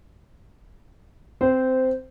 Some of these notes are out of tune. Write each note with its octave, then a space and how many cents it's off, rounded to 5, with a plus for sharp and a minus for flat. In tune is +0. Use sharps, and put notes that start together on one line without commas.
C4 -10 C5 -15